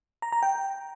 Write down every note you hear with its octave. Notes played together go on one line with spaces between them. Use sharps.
A#5
A#5
G5